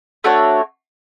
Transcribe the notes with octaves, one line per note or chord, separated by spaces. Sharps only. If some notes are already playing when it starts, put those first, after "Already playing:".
A3 D4 F#4 C#5